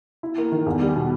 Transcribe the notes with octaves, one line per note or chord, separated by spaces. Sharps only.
E4
A#3
D#3
E2
G3
B2